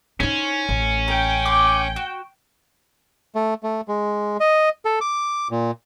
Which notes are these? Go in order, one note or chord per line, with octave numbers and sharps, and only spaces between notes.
C#4 D#4 E4 C5
A1
G5 A#5
C6 D6
F#4
A3
A3
G#3
D#5
A4
D6
A#2